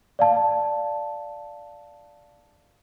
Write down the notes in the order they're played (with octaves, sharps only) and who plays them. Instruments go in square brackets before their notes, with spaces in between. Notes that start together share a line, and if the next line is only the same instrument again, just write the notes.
[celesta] D5 F5 A5